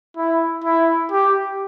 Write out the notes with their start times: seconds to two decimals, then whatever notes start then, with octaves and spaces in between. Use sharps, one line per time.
0.17 E4
0.64 E4
1.11 G4